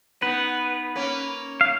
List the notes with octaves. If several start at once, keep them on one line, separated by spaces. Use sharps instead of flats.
B3 D#4 B4
A#3 C#4
F5